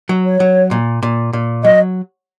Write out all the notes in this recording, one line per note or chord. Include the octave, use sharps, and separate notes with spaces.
F#3
C#5
F#3
A#2
A#2
A#2
F#3 D#5